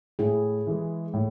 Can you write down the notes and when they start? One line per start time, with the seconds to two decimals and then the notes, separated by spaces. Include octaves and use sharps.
0.19 A2 E4 G#4
0.67 E3 G#3
1.13 A2